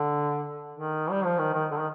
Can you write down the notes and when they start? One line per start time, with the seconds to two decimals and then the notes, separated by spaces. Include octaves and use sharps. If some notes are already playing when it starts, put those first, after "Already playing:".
Already playing: D3
0.73 D#3
1.10 G3
1.24 F3
1.38 D#3
1.54 D#3
1.71 D3
1.79 D#3